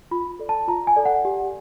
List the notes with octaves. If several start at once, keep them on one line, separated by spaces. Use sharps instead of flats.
F4 B5
A4 D5
A5
F4 A#5
G#5
A4 D5
F#5
G4